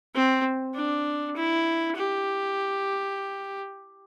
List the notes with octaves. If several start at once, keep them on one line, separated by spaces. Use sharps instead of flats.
C4
D4
E4
G4